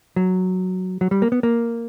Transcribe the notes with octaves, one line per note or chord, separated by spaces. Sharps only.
F#3
F#3
G3
A#3
B3
A#3